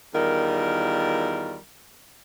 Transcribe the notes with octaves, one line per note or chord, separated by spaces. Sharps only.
E2 D#3 G3 F4 A#4